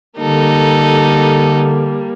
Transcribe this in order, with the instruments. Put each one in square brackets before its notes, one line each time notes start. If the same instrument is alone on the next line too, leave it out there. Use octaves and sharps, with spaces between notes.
[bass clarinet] D3 [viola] G3 A#3 [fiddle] D#4 A4